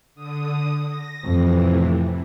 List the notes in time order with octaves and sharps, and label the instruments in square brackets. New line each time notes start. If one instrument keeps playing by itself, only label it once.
[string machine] D3 D#6
A#6
[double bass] F2 [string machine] A2 C3 E3